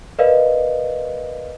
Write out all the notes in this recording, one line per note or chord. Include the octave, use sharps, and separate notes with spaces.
A#4 B4 D5 D#5 F5